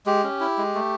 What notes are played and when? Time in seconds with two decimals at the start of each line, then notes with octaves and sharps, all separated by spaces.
0.06 G#3 G4
0.24 C#4
0.40 E4
0.58 G#3
0.75 A3